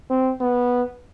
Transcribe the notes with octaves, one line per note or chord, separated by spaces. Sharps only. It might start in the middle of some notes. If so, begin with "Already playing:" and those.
C4
B3